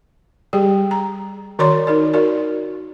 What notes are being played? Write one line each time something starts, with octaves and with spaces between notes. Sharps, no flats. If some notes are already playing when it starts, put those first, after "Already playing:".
G3 G4 G#4 G5
A#5
D#3 F#4 C#5 D5 C6 D6
D#4 A#4 D5
F#4 A#4 D5